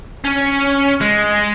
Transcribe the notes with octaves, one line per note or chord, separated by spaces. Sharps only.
C#4
G#3